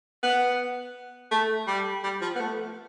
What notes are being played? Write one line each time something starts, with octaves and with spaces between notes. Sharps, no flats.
B3
A3
G3
G3
F3
B3
A3